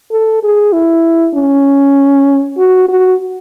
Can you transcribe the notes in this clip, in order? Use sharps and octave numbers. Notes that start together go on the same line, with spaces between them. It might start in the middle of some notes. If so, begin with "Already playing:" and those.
A4
G#4
E4
C#4
F#4
F#4